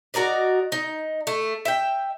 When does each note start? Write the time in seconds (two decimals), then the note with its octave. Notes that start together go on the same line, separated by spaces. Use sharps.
0.14 F#4 A#4 D5 D#5
0.72 D#4
1.27 A3
1.65 E5 G5